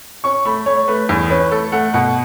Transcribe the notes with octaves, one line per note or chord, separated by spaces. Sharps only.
C#4 C#6
A3 B5
A3 C#5
A3 B4
E2
C#4 B4
A3 A4
A3 F#5
B2 F#5